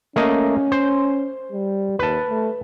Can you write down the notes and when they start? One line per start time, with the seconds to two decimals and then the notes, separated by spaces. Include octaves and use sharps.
0.16 A3 A#3 C#4 D#5
0.72 C5
1.52 G3
1.99 D#2 B4 A5
2.29 A3